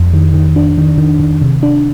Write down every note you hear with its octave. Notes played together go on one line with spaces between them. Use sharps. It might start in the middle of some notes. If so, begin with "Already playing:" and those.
Already playing: F2
D#3
D#3
D4
D#3
D#3
D#3
C3
D4